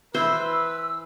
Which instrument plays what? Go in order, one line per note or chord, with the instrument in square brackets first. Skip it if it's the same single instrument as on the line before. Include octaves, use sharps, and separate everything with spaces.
[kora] E3 E4 [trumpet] B4 [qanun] C5 [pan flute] E6